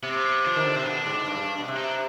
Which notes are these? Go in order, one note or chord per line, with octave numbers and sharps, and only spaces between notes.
C3 B3
C4
B3
C4
B3
F3 D4
D#3
D3
C3 C4
B2 D4
G#2
G2
G2
G2
B2
C3
D#4
D4